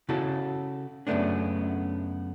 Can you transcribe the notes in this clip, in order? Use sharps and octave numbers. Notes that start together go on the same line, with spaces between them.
C#3 E4 F#4 A4
F#2 C#3 F#3 A3 B3 D4